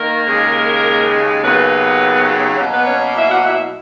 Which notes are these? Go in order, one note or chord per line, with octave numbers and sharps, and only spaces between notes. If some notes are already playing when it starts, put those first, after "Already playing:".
Already playing: D#3 A#3 A#4
D#2 C#3 G#3
D#2 C#3 F#3 A#3 B3 B4
B2 F#3 A#3
B3 B4
C#4 C#5
E4 E5
F#4 F#5
E4 E5